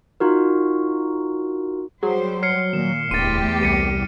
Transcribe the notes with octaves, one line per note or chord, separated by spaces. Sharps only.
D#4 F4 F#4 A#4
F#3 G3 G#4 C5
C#5 F6 C7 C#7
A#2 D#3 E7
D1 E2 A3 G4 C6 A6 D#7
C2 G3 A6 C#7 D#7